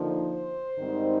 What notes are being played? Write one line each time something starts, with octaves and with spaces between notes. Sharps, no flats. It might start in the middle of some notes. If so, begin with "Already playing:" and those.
Already playing: D3 F3 A#3 D#4
C5
G#2 D#3 G3 C4 D#4